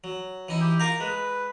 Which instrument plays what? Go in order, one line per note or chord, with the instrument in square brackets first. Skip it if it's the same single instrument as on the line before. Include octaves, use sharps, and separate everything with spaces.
[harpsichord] F#3
E3 D#4 E4
[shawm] G4
[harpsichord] F4 A#4 F5 [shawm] A#5
[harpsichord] G#3 [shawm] B4